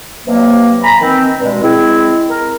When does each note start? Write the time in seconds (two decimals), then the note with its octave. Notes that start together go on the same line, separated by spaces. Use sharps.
0.26 G2 C3 F#3 A#3
0.83 G#5 A#5 B5
1.00 D#3 E3 C4
1.40 G2 B2 G#3
1.62 G#3 C4 E4
2.28 A#4